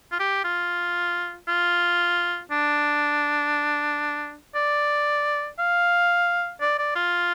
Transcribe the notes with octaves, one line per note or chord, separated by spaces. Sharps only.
F4
G4
F4
F4
D4
D5
F5
D5
D5
F4